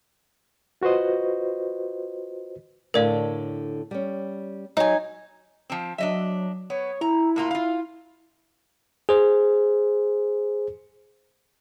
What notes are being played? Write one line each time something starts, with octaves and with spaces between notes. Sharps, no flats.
F4 F#4 B4 C5 D#5
A2 D3 A#4 C#5 D5 F5
G3 C#4
F#3 D#4 G#5
F3 C4
F#3 D4 D#5 E5
B3 C#5
E4 A#5
A2 A#3 F4
F4 F5
G#4 C5